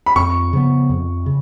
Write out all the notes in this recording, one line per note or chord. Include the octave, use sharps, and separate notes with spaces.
B5
F2 C#6
C#3 F3 B3
F2
C#3